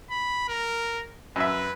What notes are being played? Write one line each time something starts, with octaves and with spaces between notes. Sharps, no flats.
B5
A#4
F#2 B4 E5